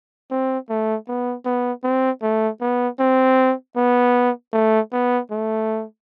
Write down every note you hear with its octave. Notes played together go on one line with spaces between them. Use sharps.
C4
A3
B3
B3
C4
A3
B3
C4
B3
A3
B3
A3